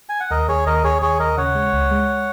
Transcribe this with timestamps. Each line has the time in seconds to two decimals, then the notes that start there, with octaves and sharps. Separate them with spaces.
0.09 G#5
0.20 F#5
0.31 D#2 A#4 D#5
0.48 D#2 G#4 C#5
0.67 D#2 A#4 D#5
0.84 D#2 G#4 C#5
1.02 D#2 G#4 C#5
1.19 D#2 A#4 D#5
1.37 C#3 C#5 F#5
1.55 G#3
1.73 C#2
1.91 G#3